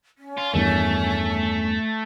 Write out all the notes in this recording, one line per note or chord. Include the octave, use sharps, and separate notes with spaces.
C#4
F4
E2 G2 D#3 A3